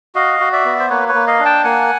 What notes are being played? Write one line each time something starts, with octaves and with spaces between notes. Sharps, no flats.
F#4 D#5 F5
F#4
D5 E5
B3
C5
A#3 B4 C#5
B4 C#5
A#3
D#5 F5
D4
G5 A5
A#3 F#5 G#5